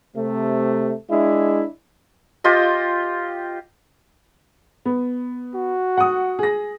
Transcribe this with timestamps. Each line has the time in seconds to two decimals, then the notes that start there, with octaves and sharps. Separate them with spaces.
0.15 C3 A3
1.09 G#3 D4 E4
2.44 F4 G4 C5 D#5
4.85 B3
5.55 F#4
5.97 F#5 D#6
6.39 G#4 A#6